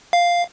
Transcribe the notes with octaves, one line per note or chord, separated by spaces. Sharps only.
F5